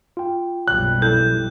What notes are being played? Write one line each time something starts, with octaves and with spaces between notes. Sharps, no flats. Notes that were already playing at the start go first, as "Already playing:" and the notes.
F4 G5
F#1 B1 G3 F#6
E4 A4 G6